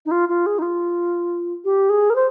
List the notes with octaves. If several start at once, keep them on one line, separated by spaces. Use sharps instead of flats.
D#4
F4
F4
G#4
D#4
F4
G4
G#4
A#4
C5